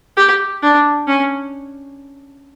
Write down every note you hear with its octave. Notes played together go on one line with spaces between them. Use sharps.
G4
D4
C#4